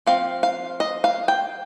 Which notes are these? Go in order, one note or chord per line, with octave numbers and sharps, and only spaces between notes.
F3 C4 F5
F5
D#5
F5
G5